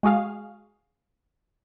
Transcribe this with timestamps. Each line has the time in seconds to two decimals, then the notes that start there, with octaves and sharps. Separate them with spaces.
0.03 G#3 F#4 G#4 F5